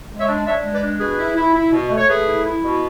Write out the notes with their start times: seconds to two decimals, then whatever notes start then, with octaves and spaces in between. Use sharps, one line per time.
0.10 G#3
0.19 C#5 E5
0.28 D4
0.46 D4 C#5 E5
0.64 G#3
0.73 B4 D5
0.82 D4
0.99 B2 G#4 B4
1.18 E4
1.36 E4
1.54 E4
1.72 B2
1.90 A3
1.97 C#5
2.08 A3 G#4 B4
2.26 E4
2.44 E4
2.62 B2